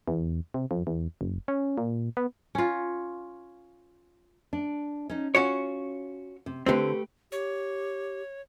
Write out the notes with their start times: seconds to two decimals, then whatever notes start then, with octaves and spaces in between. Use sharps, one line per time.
0.08 E2
0.54 C3
0.71 F2
0.87 E2
1.21 F#1
1.48 C#4
1.78 A#2
2.17 B3
2.55 C#4 F4
4.53 D4
5.10 C#4 D#4
5.35 C#4 F4 F#4 C#5
6.46 C3
6.66 D3 A3 C4 G4 B4
7.32 G4 C#5